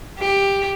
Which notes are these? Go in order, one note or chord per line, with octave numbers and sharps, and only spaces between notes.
G4